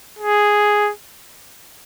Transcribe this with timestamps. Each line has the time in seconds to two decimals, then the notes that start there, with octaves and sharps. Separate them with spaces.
0.19 G#4